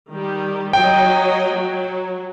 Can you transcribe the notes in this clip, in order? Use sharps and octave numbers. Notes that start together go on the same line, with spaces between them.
D#3 G3 G4
F#3 D#5 G5
F#3 F#4